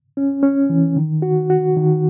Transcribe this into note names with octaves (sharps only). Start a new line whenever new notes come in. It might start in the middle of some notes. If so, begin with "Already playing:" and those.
C#4
C#4
E3
D#3
F#4
F#4
D#3